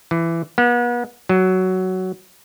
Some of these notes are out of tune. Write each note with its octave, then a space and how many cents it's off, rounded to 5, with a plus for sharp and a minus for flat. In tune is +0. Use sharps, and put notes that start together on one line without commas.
E3 +15
B3 -40
F#3 +10